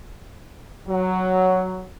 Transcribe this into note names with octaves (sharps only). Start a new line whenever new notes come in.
F#3